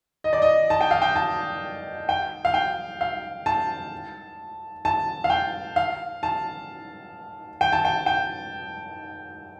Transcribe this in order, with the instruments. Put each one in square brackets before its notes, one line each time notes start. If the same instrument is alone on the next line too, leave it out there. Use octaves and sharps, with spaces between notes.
[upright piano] D#5
D5
D#5
A5
G5
F5
G5
A5
G5
F5
G5
F5
A5
A5
F5
G5
F5
A5
G5
A5
G5
G5